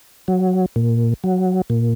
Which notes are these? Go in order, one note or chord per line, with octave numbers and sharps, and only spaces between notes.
F#3
A#2
F#3
A#2